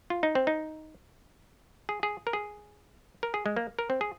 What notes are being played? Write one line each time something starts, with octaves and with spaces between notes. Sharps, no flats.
F4
D#4
C4
D#4
G#4
G#4
A#4
G#4
A#4
G#4
G#3
A#3
A#4
C4
G#4